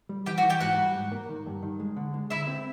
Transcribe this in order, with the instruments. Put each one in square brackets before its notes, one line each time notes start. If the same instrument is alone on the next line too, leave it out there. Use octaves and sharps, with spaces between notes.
[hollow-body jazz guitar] G3
[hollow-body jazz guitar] E3 [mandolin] G4 G5
[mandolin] F#4 F#5
[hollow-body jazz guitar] E3
[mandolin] G4 G5
[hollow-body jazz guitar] G#2 [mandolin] F#4 F#5
[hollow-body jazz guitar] G3
G#2
A#3
D#3
G2
D#3
G#3
D3
G#3
[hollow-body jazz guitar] D3 [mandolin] E4 E5
[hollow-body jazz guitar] C4